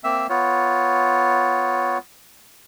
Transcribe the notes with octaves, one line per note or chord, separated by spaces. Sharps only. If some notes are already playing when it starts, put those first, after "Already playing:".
A#3 C4 E5 E6
B3 F4 C#5